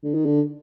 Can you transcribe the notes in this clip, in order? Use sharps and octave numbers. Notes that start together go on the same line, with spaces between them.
D3
D#3
D3